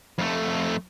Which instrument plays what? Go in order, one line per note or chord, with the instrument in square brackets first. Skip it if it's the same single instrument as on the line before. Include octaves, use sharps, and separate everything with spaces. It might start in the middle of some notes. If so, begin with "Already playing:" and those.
[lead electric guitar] F2 A3